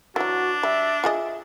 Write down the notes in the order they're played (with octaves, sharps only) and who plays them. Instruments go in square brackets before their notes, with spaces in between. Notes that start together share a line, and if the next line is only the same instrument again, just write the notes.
[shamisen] E3 F#3 [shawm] D4 [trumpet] F#4
[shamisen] G3 [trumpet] E5
[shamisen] F4 G#4 D#5 [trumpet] E5